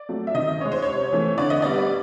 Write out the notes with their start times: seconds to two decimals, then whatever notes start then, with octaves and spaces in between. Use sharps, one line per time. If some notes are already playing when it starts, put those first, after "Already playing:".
Already playing: D5
0.09 F#3 A3
0.27 E5
0.34 D#3 D#5
0.60 G#3 C#4 C#5
0.72 C5
0.82 C3 C#5
1.12 E3 A3 C#4
1.38 D3 D5
1.50 D#5
1.62 G3 B3 D5
1.78 D5